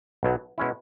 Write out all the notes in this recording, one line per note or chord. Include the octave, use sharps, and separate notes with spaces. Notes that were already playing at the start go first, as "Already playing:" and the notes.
B1 B2 F#3
B2 G#3 C#4 E4